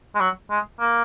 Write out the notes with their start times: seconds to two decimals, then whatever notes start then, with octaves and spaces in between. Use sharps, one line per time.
0.15 G#3
0.20 F#3
0.50 G#3
0.80 A#3